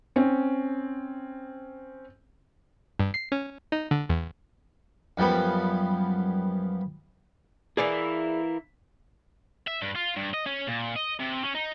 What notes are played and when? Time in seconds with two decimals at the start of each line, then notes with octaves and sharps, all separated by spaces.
0.16 C4 C#4
3.00 G2
3.14 C7
3.32 C#4
3.72 D#4
3.91 D3
4.09 E2
5.18 F#2 F3 G3 B3
7.77 E3 A#3 E4 G#4 D5
9.68 E5
9.82 G2
9.95 F4
10.16 G2
10.34 D#5
10.46 C#4
10.67 A#2
10.96 D#5
11.20 C3
11.43 C#4
11.55 D#4